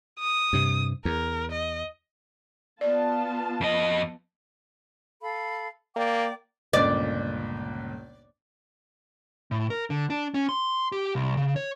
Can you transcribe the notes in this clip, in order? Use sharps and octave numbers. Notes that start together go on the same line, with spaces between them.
D#6
G2 C3
E2 A#4
D#5
B3 F4 D5 A5
F2 D#5
A4 F5 B5
A#3 D5 G5 D6
G1 C#2 A#2 D5
A2
A#4
D3
D4
C#4
C6
G4
C2
C#3
C#5